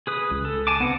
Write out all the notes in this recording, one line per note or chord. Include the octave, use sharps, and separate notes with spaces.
G#4 B4 D#6
C#2
A4
G#5 A5 D6
D3 B3 C4 F#5